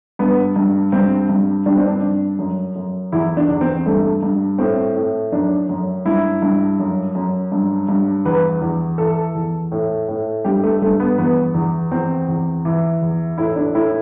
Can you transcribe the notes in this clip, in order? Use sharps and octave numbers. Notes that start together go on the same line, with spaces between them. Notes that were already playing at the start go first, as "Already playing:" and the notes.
G2 B3
G2
G2 C4
G2
G2 D4
C4
D4
G2
F#2
F#2
E2 E4
D4
E2
C4
G2 A3
G2
A2 C4
A2
F#2 D4
F#2
G2 E4
G2
F#2
F#2
G2
G2
E2 B4
E2
E3 A4
E2
A2
A2
G2 G4
A3
G2 A3
B3
E2 B3
E2
E2 C4
E2
E3
E2
A2 E4
D4
A2 E4